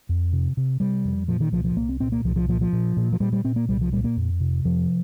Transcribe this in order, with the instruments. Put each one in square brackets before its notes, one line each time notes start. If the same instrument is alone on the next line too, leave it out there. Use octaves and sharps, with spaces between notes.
[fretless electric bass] F2
C3
C3
C3 G3
F2
A#2 F3
D#3
C2 F3
F3
C2 A#3
C4
A#2 C4
A#3
C2 F3
F3
A#2 F3
F3
A#2
A#2
F3
A#2 G3
G3
A#2 C4
A#3
C2 G3
F3
A#2 G3
A#3
F2
C3
F2 F3